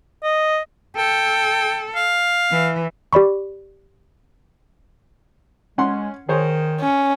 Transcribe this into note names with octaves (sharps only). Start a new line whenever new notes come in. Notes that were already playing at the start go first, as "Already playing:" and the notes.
D#5
A4 G5
F5
E3
G4 D5 B5 C#6
G#3 C#4 F#5 C6
D#3 G#4 C5 C#5
C#4